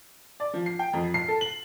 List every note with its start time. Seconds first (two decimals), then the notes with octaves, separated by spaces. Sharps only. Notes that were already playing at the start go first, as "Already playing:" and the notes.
0.40 D5
0.53 F3
0.66 C7
0.79 G5
0.93 F2
1.14 C7
1.28 A4
1.41 F#7